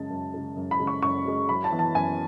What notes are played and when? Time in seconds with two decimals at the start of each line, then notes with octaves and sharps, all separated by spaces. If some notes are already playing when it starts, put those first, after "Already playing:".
Already playing: F#2 C#3 G#3 A5
0.10 F#2
0.34 C#3 G#3
0.56 F#2
0.71 B5
0.80 C#3 G#3
0.87 C#6
1.03 F#2 C#6
1.26 C#3 G#3
1.49 F#2 B5
1.64 A5
1.72 E3 B3
1.79 A5
1.95 F#2 G#5